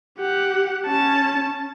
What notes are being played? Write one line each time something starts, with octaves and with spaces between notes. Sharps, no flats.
G4 F#5
C#4 A5